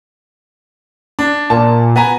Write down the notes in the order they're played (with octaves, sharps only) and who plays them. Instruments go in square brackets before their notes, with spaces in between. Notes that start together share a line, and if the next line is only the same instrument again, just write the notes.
[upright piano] D4
[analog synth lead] A#2 [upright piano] A5
[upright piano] B3 G#5 A#5